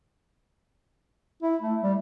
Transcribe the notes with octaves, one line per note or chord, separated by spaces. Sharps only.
E4
A3
G3